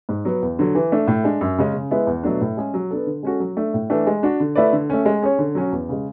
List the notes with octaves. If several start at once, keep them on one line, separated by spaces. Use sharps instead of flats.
G#2
F#3 B3
E2
D3 F#3
E3
A3 D4
A2
G#3 D4
F#2
C#3 G#3 C#4
C#3
G#3 B3 E4
E2
B2 F#3 A3 D4
A2
G#3 C#4 G#4
F#3
B3 D4 A4
D3
G#3 C#4 F#4 A4
F#3
A3 D4
A2
E3 A3 D4
G#3
D4 F#4
D3
A3 E4 B4 D5
D3
A3 C#4
G#3
C#4 G#4 C#5
D3
F#3 C#4 F#4
E2
C#3 G#3